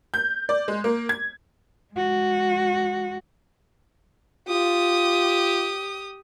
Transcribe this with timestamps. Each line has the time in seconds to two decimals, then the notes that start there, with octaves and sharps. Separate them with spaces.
0.14 G6
0.49 D5
0.68 G#3
0.84 A#3
1.09 G#6
1.94 G#3 F#4
4.48 F4 G4 D#6